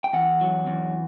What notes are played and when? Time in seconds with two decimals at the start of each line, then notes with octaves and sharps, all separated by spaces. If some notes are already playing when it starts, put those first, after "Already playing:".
0.04 G5
0.13 E2 F#5
0.41 F#3
0.66 E2